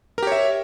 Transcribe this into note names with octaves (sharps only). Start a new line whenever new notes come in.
G4 A#4 C#5 E5